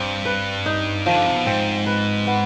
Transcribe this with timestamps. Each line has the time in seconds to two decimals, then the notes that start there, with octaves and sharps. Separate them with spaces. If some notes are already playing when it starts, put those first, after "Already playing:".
Already playing: G2 C4
0.25 B4
0.66 D#4
1.06 D#3 F3
1.16 D3
1.26 C3
1.36 B2
1.46 G#2 C4
1.86 B4
2.27 B3